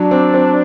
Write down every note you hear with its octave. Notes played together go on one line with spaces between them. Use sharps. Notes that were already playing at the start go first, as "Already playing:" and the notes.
Already playing: F#3 D4
C4
C4